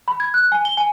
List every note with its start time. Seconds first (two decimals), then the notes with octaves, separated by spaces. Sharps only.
0.08 B5
0.20 G#6
0.34 F#6
0.52 G#5
0.65 G7
0.77 G#5